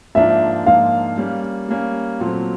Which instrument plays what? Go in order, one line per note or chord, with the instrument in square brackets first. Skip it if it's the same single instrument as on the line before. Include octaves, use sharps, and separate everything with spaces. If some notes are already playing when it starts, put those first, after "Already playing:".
[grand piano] G#2 F3 A#3 D4 F4 [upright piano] E5
[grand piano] G#2 F3 A#3 D4 F4 [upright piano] F5
[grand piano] G3 A#3 C#4
G3 A#3 C#4
A#2 F#3 A3 C4